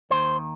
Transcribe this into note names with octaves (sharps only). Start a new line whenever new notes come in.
D#2 D#3 C5